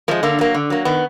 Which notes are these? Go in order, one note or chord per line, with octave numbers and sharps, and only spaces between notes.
F3 G#3 A#3
D3 A#3
F#3 A#3
D3
F#3 A#3
D#3 B3